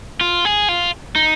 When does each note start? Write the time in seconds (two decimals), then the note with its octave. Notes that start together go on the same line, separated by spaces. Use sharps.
0.21 F4
0.45 G#4
0.69 F4
1.16 D#4